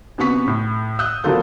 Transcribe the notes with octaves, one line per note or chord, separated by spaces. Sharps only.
F#2 C3 B3 C#6 B6
A2
D#6 E6 F#6 G6
G#1 F#3 A#3 F4 A4 G6